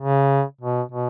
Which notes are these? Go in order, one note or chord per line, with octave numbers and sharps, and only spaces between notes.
C#3
B2
B2